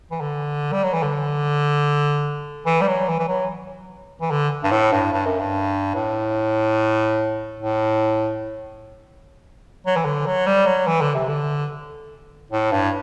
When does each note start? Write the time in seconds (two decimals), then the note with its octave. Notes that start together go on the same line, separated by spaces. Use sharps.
0.11 E3
0.21 D3
0.73 G3
0.83 F#3
0.93 E3
1.03 D3
2.66 E3
2.81 G3
2.88 F#3
3.08 E3
3.19 E3
3.28 F#3
4.21 E3
4.31 D3
4.64 G2
4.71 A2
4.92 G2
5.13 G2
5.26 F#2
5.39 G2
5.95 A2
7.60 A2
9.86 F#3
9.96 E3
10.05 D3
10.26 F#3
10.47 G3
10.66 F#3
10.87 E3
11.01 D3
11.14 C3
11.28 D3
12.51 A2
12.71 G2